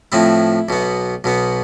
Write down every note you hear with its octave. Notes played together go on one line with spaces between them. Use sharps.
A2 F3 C4 E4
B1 B2 B3
B1 B2 B3